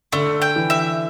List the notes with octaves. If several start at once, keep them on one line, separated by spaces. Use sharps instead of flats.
D3 A3
G5
E3
E5